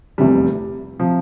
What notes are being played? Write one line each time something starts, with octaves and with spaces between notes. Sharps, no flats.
F1 E2 C3 G3
C3 F3